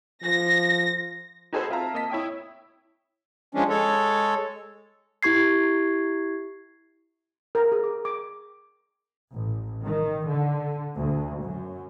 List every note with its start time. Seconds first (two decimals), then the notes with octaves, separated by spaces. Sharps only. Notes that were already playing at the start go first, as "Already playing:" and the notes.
0.24 F3 A#6
1.53 D#4 F#4 G#4 A4 B4 C5
1.70 C4 F4 E5 F5 A5 A#5
1.94 A#3 D#5 A5 B6
2.10 E4 C#5 G5 D#6
3.55 F3 G#3 C#4 D4
3.70 G#3 A4 C#5
5.23 E4 G4 C#6 G#6 C7
7.55 A#4
7.72 G#4
7.83 D6
8.05 D6
9.34 A1
9.86 D#3
10.28 D3
10.98 D2
11.43 F#2